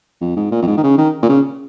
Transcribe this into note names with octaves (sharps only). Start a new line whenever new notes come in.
F2
G#2
A#2
F2
G#2
D#3
C#3
D#3
A#2
C#3